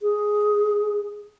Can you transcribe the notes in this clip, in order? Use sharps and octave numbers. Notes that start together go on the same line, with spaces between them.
G#4